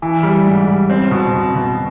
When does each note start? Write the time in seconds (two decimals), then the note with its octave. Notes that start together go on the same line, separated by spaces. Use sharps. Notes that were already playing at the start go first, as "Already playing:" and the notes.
0.02 E3
0.23 G3
0.46 G#2
0.68 G3
0.90 C4
1.11 B2
1.34 B2
1.55 B2